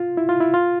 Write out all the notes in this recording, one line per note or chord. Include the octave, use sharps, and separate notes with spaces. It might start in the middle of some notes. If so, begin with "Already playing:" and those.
Already playing: F4
E4
F4
E4
F4